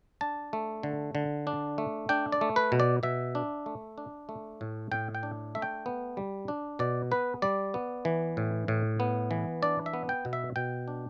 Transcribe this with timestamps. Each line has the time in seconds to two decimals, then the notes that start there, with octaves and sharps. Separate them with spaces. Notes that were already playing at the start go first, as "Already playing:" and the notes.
0.21 D4 A5
0.53 A3
0.83 D3
1.15 D3
1.47 D4
1.78 A3
2.09 D4 G5
2.32 D5
2.41 A3
2.56 B4
2.72 B2
2.80 D5
3.03 B2 E5
3.35 D4
3.66 A3
3.98 D4
4.29 A3
4.61 A2
4.91 A2 G5
5.15 G5
5.23 D4
5.55 A3 E5
5.62 G5
5.86 B3
6.17 G3
6.48 D4
6.79 B2 D5
7.11 B3 B4
7.42 G3 D5
7.74 B3
8.05 E3
8.37 A2
8.68 A2
9.00 B3
9.31 E3
9.62 D4 D5
9.86 E5
9.93 B3
10.09 G5
10.25 B2
10.33 E5
10.56 B2 G5
10.88 D4